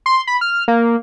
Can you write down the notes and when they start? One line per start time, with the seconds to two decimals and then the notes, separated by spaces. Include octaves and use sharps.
0.06 C6
0.27 B5
0.41 F6
0.68 A#3